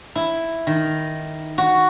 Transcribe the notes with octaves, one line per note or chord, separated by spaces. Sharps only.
E4
D#3
F#4